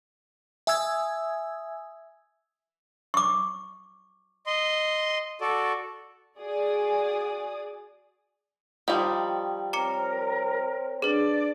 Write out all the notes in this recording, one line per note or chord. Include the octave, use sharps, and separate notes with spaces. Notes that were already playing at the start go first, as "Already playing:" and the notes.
E5 G#5 D#6 E6 G#6
C#6 D6
D#5 C6
F#4 A4 D5
F#4 G#4 D5 D#6
D#3 F3 G3 F5
C4 A#4 C5 C#5 A#5 D6 C#7
D4 G#4 B4 D5